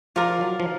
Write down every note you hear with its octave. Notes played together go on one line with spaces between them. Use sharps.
F3 F4 A#4 D5
F#3
F3